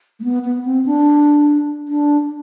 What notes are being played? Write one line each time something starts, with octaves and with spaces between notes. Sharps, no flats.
A3
B3
B3
C4
D4
D4